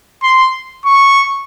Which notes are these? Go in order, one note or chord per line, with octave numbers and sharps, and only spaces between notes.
C6
C#6